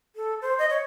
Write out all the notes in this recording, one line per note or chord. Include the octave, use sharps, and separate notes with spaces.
A4
C5
D#5
C#5